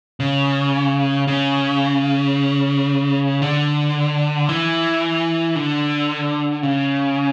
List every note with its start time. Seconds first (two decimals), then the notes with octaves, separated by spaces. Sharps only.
0.20 C#3
1.28 C#3
3.42 D3
4.49 E3
5.56 D3
6.63 C#3